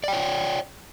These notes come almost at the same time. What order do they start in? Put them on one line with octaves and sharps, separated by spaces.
D5 G5 C#5